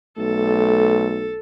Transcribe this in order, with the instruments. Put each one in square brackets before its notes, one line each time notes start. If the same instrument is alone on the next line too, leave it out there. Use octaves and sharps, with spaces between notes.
[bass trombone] B1 [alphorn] A3 [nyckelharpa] A4